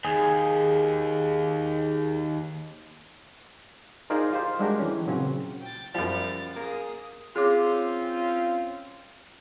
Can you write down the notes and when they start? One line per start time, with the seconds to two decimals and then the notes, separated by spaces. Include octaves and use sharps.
0.05 D#2 G#4
4.10 D#4 F4 G#4 A#4 C5 D5
4.33 F4 G4 C5
4.59 G3 G#3 D4 F#4 G4 A#4
4.79 E3 C#4
5.07 A#2 C#3 F#3 C4 C#4
5.62 G5 A6
5.94 F#2 F3 G3 A6
6.56 A#3 G#4 D#6
7.36 C4 C#4 F4 G#4 C#5 D6